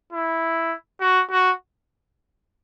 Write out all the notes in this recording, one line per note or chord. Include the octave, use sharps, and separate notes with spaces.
E4
F#4
F#4